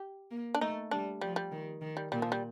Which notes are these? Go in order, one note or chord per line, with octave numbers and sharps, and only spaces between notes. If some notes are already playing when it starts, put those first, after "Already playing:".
Already playing: G4
A#3
D4
A3 D#4
G3 D4
F3 G3
G3
D#3
D#3
G3
A#2 G3
F3
G3